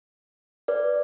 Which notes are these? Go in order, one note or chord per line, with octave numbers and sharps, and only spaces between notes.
B4 D5